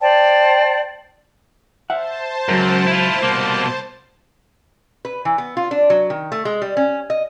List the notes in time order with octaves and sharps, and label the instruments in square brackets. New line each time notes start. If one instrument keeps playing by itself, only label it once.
[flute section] C5 D5 G5 A5
[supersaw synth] C5 A5 [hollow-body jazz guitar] E5 F#5
[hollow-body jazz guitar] C#2 F#3 A#4 [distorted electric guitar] F#2
[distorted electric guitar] E4 F4
[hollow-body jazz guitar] C2 [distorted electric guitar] B2 A#3
[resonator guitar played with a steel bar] B4
E3
B3
F4
D4
F#3
D#3
A3
G#3
G3
C#4
D#5